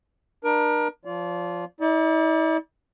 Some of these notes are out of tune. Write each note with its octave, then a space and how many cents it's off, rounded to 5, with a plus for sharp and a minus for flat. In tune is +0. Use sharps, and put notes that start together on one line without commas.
D4 +40 A#4 +35
F3 +0 F4 +0 D5 -35
E4 -45 D5 +0